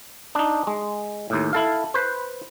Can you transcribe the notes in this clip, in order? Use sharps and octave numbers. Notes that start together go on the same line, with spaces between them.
D4 D#4
G#3
D#2 A2
E4 A4 F5
B4 C5